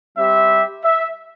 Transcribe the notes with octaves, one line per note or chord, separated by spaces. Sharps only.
G3 C4 G4 E5
E5